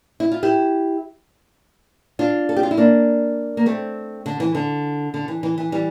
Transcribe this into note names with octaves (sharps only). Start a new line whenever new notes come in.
E4
F4
E4 G4
D4 F4
A4
G4
F4
E4
A#3 D4
A#3
A3 C4
D3
E3
D3
D3
E3
E3
E3
E3 G3